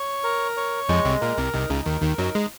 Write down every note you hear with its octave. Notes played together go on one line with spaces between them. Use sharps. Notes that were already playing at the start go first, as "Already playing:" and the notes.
Already playing: C#5
A#4
C#5
F2 F3 G#3
C2 C3
A#2 A#4
C2 C3
C2 C3 D#4
C#2 C#3
D#2 D#3 A#4
D#2 D#3
F#2 F#3 D#4
G#3